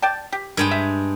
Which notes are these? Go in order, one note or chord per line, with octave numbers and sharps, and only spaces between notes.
D5 G5 A5
G4
G2 G#3 A#4 G5
E5